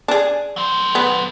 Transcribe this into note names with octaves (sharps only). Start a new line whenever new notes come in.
D4 G#4
F#3 C5
B3